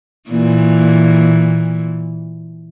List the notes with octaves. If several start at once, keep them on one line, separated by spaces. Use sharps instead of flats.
A#2 E3